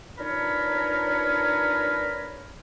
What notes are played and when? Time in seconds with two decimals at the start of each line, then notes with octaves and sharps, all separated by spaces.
0.18 D4 D#4 F4 A#4 B4 C#5